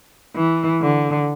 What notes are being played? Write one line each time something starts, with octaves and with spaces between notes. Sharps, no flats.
E3
D3